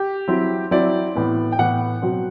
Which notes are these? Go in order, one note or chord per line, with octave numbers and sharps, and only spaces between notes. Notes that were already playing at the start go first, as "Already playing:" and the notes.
Already playing: G4
F#3 C4 E4
F#3 C4 E4 D5
A2 E3 B3
G5
A2 E3 B3 F#5
B2 F#3 C4